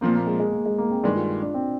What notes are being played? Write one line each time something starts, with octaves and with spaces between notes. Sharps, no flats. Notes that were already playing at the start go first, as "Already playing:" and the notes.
A#2 F3 A#3 C4
A#3
G#3
G#3
A#3
G#3
A#3
C4
G2 D#3 G#3 D4
F4
D4
C4